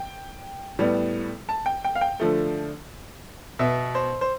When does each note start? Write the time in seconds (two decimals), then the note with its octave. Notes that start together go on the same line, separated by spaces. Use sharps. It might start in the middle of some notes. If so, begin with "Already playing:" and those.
Already playing: G5
0.79 A2 G3 B3
1.49 A5
1.66 G5
1.85 G5
1.95 F5
2.01 G5
2.20 D3 F3 A3
3.59 B2 B3 E5
3.95 C5
4.21 C5